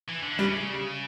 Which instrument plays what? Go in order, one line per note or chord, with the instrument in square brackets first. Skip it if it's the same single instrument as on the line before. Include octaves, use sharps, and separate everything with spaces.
[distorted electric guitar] E3
D3
[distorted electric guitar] C#3 [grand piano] G3